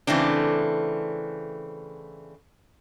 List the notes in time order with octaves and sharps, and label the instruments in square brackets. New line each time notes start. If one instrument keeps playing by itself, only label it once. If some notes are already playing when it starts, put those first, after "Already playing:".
[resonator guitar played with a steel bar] C#3 E3 A3 C4 D4